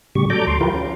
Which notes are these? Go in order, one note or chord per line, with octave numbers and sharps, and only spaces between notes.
A2 C#3 G3 G4 C#6
F#3 A4 D5 A#5 D6 G6
D2 C6
F3 E4 F4 G4 A#4 B4
C#4